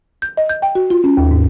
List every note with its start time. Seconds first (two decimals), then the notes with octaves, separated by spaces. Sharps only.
0.22 G6
0.37 D#5
0.49 G6
0.62 G5
0.75 F#4
0.90 F4
1.04 C#4
1.17 D#2
1.31 G#2